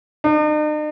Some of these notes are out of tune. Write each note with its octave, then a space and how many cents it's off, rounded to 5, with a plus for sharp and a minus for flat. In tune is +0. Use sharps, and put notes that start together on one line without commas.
D#4 -45